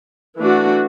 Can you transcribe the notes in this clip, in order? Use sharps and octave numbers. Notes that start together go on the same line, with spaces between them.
E3 A3 D4 F#4